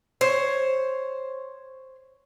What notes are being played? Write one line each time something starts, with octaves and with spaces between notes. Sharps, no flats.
C5 C#5